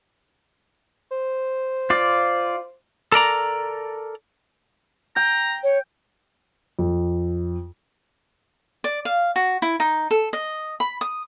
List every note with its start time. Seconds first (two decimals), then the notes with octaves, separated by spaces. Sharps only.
1.11 C5
1.90 F4 D5
3.12 A4 A#4 D5 A#5
5.16 G5 A#5
5.63 C#5
6.79 F2
8.84 D5
9.05 F5
9.36 F#4
9.62 E4
9.80 D#4
10.11 A4
10.33 D#5
10.80 B5
11.01 D#6